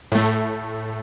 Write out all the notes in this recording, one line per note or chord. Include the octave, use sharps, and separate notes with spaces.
A2 A3